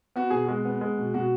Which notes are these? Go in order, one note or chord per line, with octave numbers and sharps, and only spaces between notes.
B3 F#4
B2 G#4
F#4
G#3
B3
G#3
B2
B2 F#4